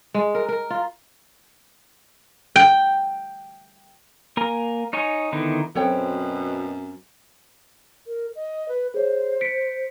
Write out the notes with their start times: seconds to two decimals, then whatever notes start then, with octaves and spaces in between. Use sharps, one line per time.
0.14 G#3
0.35 A#4
0.49 A#4
0.70 F4
2.56 G5
4.37 A#3 A#4 G#5 A#5
4.93 D#4 C#5 D#5 G#5
5.32 D3 D#3 B3 D#4 E4
5.75 F#2 B2 F#3 C4 A4 C#5 G5
8.07 A#4
8.36 D#5
8.69 B4
8.94 G#4 C5 C#5
9.41 B6 C#7 D7